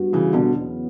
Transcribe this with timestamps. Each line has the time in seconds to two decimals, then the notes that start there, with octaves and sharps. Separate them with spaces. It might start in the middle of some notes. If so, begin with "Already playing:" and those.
Already playing: G2 F#3 B3 F#4
0.13 C#3 E3
0.33 B2 D3
0.55 E2 C#3 F#3 B3